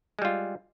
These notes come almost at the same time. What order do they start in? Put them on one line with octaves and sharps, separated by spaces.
G#3 G3 F4